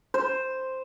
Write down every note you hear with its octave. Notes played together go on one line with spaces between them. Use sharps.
C5